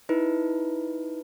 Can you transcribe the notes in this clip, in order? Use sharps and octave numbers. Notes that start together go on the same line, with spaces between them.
D#4 E4 B4